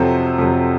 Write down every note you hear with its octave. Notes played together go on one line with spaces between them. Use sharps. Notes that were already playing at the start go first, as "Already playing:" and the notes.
Already playing: F2 C3 F#3 A4 C5
F2 C3 F#3